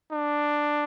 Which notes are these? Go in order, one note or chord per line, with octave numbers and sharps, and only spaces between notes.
D4